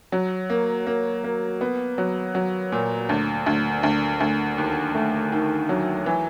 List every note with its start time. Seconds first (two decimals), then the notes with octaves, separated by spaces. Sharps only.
0.12 F#3
0.50 A#3
0.87 A#3
1.24 A#3
1.61 B3
1.98 F#3
2.35 F#3
2.72 A#2
3.09 D2
3.46 D2
3.83 D2
4.20 D2
4.58 D#2
4.95 A3
5.32 D#3
5.69 F#3
6.06 E3